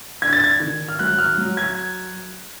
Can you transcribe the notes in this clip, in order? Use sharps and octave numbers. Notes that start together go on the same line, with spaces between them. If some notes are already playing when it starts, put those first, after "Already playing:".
D4 G#6
A6
G#6
D#3
F6
F#3 F#6
F6
F#3
G#6